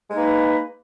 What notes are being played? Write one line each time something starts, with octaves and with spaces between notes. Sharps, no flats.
G#3 A#3 D#4 B4